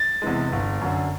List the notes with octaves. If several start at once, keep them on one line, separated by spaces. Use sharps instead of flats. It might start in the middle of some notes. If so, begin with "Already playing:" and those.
Already playing: A6
E2 C3 E3 G#3
G1
F#2 D3